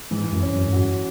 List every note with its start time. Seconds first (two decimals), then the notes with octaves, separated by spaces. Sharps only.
0.11 G#2 E3
0.33 F#2
0.43 C#4
0.53 F#2
0.67 G#2
0.73 F#2 F#4